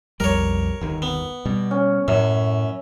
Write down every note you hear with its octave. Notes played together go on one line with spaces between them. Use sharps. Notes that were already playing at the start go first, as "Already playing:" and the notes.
B1 F2 G3 A#4 C#5
G1 D#2 D#3
B3
B2 G3
C#4
F#2 A2 E5